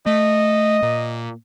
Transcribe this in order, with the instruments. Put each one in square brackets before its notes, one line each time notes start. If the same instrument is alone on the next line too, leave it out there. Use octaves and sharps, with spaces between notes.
[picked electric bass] A3 [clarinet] D#5
[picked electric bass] A#2